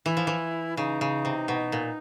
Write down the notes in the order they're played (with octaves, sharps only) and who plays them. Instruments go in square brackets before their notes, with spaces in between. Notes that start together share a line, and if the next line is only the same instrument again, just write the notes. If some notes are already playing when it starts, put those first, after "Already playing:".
[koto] E3 [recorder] E4
[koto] F3
E3
[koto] C#3 [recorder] D#4
[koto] C#3
C3
B2
A#2